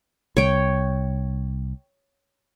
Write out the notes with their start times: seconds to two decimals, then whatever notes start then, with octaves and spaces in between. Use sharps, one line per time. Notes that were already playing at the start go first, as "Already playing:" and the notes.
0.37 C2 C#5 G5